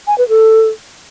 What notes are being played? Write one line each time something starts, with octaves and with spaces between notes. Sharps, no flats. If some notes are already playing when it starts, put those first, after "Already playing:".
G#5
B4
A4